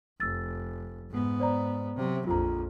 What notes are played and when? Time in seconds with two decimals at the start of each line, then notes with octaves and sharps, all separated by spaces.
0.20 F1 E6 A6
1.10 G#2 B3
1.40 C5 D5 A#5
1.96 C3 F#3
2.27 A#1 F2 F4 A#5